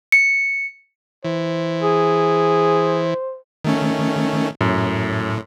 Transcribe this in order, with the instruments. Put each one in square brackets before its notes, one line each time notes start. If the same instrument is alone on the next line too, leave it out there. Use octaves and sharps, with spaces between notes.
[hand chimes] C#7
[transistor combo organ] E3 [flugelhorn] C5
[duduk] G#4
[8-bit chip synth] D#3 A3 C#4
[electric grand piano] F#2 [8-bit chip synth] A2